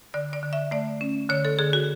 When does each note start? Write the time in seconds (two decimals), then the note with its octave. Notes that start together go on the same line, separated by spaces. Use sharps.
0.14 D3 D5
0.33 D5
0.43 D3
0.53 E5
0.71 A3 D5
1.01 C#4
1.30 D3 C#5
1.45 A4
1.59 D3 G#4
1.73 F#4